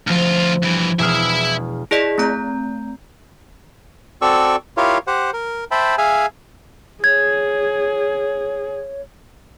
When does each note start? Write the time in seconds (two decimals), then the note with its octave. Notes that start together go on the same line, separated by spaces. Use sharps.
0.07 D2 F3 F4 F6
0.63 G2 E3
0.99 E1 E4 G#4 E5 F6
1.91 E4 G#4 D5 D#5 B6
2.18 A3 C4 A#5 G6
4.22 C4 F#4 A4 D5 C#6 E6
4.77 E4 F4 G4 A#4 C#5 F5
5.07 G4 C5 F#5
5.33 A#4
5.71 C5 E5 G5 A5 B5
5.98 G#4 E5 F5 G#5
7.04 G#4 C#5 G#6